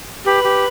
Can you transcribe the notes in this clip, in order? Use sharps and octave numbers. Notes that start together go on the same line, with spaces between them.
G4 B4
G4